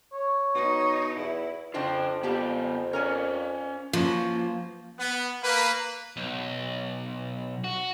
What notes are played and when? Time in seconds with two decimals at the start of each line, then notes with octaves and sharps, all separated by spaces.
0.13 C#5
0.55 B2 D#4
1.17 E2 E4
1.74 F2 C#3 D4 F4 C5 G5
2.23 G3 B3 F4 G4 A5
2.93 C#4 A#4 C#5 D5 G#5
3.93 F3 A#3 C#4 F#4 B4
4.99 B3
5.44 A#3 B4
6.17 B1
7.64 F#4